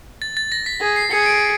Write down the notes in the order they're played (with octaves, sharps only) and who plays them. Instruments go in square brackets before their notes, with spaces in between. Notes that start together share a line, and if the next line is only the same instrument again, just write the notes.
[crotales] A6
A6
A#6
B6
[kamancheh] G#4
[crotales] C7
[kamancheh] G#4 [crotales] C#7
[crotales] D7